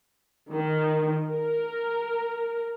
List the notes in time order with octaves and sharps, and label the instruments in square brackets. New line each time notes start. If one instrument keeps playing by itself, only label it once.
[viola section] D#3
A#4